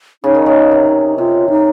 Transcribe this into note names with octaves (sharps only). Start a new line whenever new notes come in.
C#3 D#4
D#3
C#3
C3
C3 F4
D#4